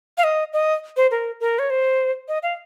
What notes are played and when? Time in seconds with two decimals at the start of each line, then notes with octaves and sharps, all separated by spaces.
0.18 F5
0.24 D#5
0.53 D#5
0.97 C5
1.11 A#4
1.40 A#4
1.59 C#5
1.70 C5
2.28 D#5
2.43 F5